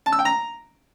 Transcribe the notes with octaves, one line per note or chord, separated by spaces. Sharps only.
A5
E6
G5
A#5